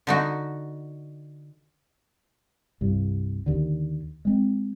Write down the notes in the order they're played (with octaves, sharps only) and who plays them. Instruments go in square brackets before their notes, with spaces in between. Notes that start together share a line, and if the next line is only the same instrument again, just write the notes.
[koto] D3 D#4 F#4
[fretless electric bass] C2 G2
D#2 D3
G#3 C4